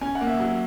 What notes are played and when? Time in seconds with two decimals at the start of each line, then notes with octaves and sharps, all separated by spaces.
0.01 C#4 G#5
0.15 F#5
0.21 A#3
0.27 E5
0.40 F#3